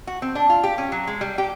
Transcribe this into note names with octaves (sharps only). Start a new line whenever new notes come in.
F#4
C4
D4
F4
G4
C#4
F#3
G#3
G3
G4